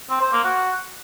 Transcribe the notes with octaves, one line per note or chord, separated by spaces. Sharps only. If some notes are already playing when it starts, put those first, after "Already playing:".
C4
C5
A#3
F#4